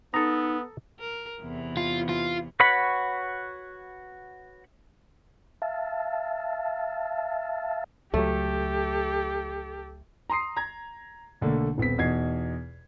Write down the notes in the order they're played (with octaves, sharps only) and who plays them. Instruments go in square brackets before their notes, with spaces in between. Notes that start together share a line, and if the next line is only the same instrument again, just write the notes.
[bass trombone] B3 [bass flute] D#4 [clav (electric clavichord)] A4 A#5 [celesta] D#6 E6
[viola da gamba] A#4
E2 C3 E3
[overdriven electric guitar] F4
F4
[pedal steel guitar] F#4 B4 C#5 F#5 B5
[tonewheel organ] E5 F5 A5
[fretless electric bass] C#2 F#3 [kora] A3 [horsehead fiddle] G4 A4
[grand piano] A#5 C6 D#6 C7
A#5 G#6
B1 D3 A3 A#3
D#1 B3 C4 B6
E2 B2 D#4 G#6 C7